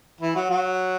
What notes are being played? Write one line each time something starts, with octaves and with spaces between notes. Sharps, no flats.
E3 E4
F#3 F#4
F#3 F#4